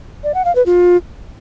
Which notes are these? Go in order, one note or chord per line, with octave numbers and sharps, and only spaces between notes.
D5
F#5
F5
B4
F4